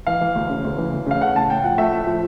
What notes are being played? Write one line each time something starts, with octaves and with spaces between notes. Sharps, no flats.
E3 F5
E3
D2
C#3
D2
E3
D2
C#3 F5
A3 F#5
A2 A5
A2 G5
F3 F#5
A3 E5
A2
F3